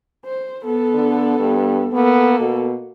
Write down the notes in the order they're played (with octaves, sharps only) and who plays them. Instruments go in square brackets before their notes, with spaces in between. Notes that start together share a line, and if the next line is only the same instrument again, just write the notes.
[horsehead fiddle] C5
B3 A4
[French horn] D3
G2
[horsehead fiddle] A#3 A4 [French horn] B3
[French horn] B2